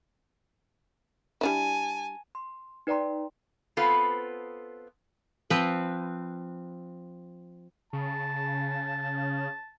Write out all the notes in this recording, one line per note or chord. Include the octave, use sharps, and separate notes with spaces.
G3 D4 E4 G#5 A5
C6
D#4 B4 D5 G5 A#5 C6
B3 C4 F4 A4 B4
F3 C4 B4
C#3 A5